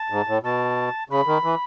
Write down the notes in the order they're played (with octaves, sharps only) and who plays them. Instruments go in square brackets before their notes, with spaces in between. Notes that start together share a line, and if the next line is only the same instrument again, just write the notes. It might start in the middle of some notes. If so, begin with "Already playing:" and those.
Already playing: [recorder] A5
[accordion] G#2
A2
[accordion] B2 [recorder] A5
[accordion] C#3 [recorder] B5
[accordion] D#3
E3